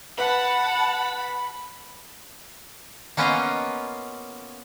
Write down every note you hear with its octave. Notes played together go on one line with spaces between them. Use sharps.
B4 F#5 A5 B5
A#3 B3 C#4 F4 D#5 A#5